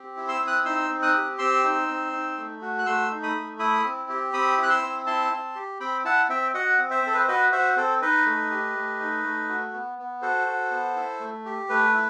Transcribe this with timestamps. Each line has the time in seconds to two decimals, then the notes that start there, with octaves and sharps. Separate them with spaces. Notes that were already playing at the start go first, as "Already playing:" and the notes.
Already playing: C4 G4
0.17 E4
0.28 C6 E6
0.41 C4
0.47 D#6 F#6
0.65 D#4 C6 E6
0.89 C4
1.02 D#6 F#6
1.14 G4
1.39 C4 C6 E6
1.64 D#4
1.88 C4
2.13 D#4
2.38 A3
2.62 F#4
2.79 F#6
2.86 A3 C6 E6
3.11 D#4
3.23 B5 D#6
3.35 A3
3.59 E4 B5 D#6
3.84 C4
4.09 G4
4.33 C4 B5 D#6
4.58 E4
4.63 F#6
4.70 C6 E6
4.82 C4
5.06 E4 A5 C6
5.32 C4
5.55 G4
5.80 C4 G5 B5
6.05 E4 F#5 A5
6.29 C4 E5 G5
6.54 F#4 D#5 F#5
6.78 C4
6.91 C5 E5
7.03 C4 A4
7.14 B4
7.21 C5
7.28 F#4 B4 D#5
7.52 F#4 C5 E5
7.76 C4 A4 C5
8.02 D#4 B4 D#5
8.26 A3
8.51 G4
8.75 A3
9.00 D#4
9.24 A3
9.49 F#4
9.73 B3
9.98 B3
10.22 F#4 A4 C5
10.47 F#4
10.71 B3
10.96 E4
11.20 A3
11.46 G4
11.69 A3 B4
11.94 E4